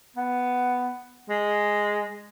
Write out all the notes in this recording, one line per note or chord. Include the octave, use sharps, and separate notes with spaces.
B3
G#3